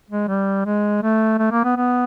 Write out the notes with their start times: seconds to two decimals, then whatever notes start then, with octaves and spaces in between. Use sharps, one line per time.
0.10 G#3
0.28 G3
0.66 G#3
1.02 A3
1.38 A3
1.51 A#3
1.64 B3
1.76 B3